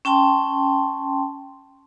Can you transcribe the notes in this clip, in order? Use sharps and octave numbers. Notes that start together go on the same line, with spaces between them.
C#4 G5 A5 C6